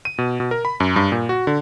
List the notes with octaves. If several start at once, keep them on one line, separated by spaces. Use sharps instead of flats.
D#7
B2
B2
A#4
B5
F#2
G2
A#2
F#4
D3